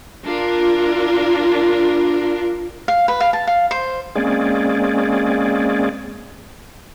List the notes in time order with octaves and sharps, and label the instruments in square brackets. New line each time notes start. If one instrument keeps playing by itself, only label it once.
[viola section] D4 F4 A#4
[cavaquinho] F5
B4
F5
A5
F5
C5
[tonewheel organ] G#3 A#3 C4 C#4 G#4 D5